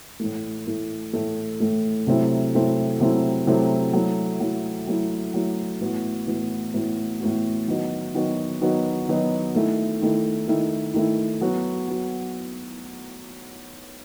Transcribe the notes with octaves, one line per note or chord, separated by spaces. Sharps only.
A2 E3 A3
A2 E3 A3
A2 E3 A3
A2 E3 A3
C3 F#3 A3 C4 E4
C3 F#3 A3 C4 E4
C3 F#3 A3 C4 E4
C3 F#3 A3 C4 E4
F#3 A3 E4
F#3 A3 E4
F#3 A3 E4
F#3 A3 E4
A2 E3 B3 F#4
A2 E3 B3 F#4
A2 E3 B3 F#4
A2 E3 B3 F#4
D#3 F#3 B3 D#4 F#4
D#3 F#3 B3 D#4 F#4
D#3 F#3 B3 D#4 F#4
D#3 F#3 B3 D#4 F#4
D#3 A3 E4
D#3 A3 E4
D#3 A3 E4
D#3 A3 E4
F#3 B3 F#4
F#3 B3 F#4